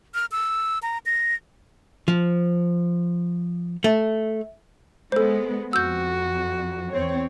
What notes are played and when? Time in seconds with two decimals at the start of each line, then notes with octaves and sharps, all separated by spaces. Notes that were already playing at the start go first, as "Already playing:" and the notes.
0.14 F6
0.32 E6
0.83 A#5
1.06 A#6
2.08 F3
3.84 A3
5.12 G#3 B3 A4 C5
5.73 F2 F#4 E6 G6
6.91 E2 C4 C#5